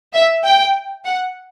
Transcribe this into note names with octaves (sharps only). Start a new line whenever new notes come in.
E5
G5
F#5